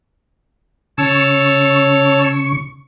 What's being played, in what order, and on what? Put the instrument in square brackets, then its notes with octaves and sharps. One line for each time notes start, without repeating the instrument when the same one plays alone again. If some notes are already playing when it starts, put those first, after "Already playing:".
[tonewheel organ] C#3 C#6 [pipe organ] C#5 A5 E6